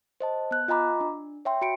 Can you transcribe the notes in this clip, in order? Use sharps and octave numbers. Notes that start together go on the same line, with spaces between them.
C5 D#5 A5
B3 F#6
F4 D#5 G#5 A#5 B5 D6
D4
C#5 E5 G5 C6
F#4 B5 C#7 D7